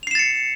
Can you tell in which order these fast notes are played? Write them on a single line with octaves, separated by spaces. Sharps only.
F7 C7 E7 A6 C#7